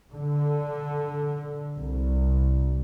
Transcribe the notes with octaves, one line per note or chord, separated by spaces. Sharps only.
D3
C2